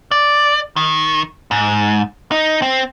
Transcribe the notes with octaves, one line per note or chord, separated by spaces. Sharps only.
D5
D#3
G#2
D#4
C4